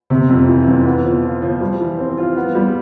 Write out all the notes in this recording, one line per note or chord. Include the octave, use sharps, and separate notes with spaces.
C3
F2
E3
F2
B3
F3
F4
F3
G3
E3
C4
F4
B3
G3